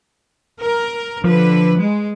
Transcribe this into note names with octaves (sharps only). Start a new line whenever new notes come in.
A#4
D3 F3 B4
G#3